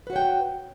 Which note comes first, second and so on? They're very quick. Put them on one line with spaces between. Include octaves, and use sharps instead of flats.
B4 F#4 C#5 G5